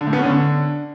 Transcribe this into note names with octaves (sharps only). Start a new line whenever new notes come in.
D3
A2
B3
C#4
D3